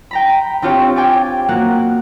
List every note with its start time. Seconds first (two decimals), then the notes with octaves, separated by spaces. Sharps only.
0.11 G5 A#5 B5
0.62 C4 D4 F4 G4 C#5 G5
0.96 G5 G#5 D6 A6
1.48 A#3 F#4 F#5